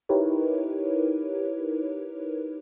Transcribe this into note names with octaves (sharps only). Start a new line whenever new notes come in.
D#4 E4 G4 A#4 B4 C#5